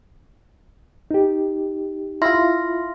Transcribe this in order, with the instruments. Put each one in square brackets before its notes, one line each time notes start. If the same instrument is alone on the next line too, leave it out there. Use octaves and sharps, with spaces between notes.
[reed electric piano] D#4 G4
[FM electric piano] E4 F4 [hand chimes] C6 F6 A#6